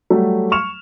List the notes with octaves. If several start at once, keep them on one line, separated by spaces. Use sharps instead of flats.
F#3 G3 A3
C#6 F6 E7 F7